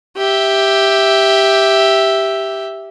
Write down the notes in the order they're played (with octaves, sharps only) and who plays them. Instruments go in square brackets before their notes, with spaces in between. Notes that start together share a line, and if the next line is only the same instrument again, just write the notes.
[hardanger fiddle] G4 E5